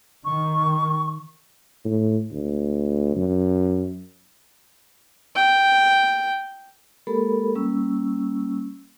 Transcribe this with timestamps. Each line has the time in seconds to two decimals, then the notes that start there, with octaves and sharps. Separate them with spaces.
0.25 D#3 C#6
1.85 A2
2.31 D2
3.15 F#2
5.35 G5
7.07 G#3 A#3 G4 A4 A#4 B5
7.55 G3 A#3 C#4 C#6 E6